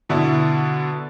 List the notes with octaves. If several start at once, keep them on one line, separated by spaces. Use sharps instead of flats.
B2 D3 E4